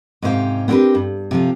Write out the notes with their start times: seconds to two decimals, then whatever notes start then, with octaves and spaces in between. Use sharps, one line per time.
0.22 G#2 C3 C#4 C5 F5 G5
0.68 B3 C4 D4 G4 A#4 B4
0.95 G2
1.31 C3 F3 F4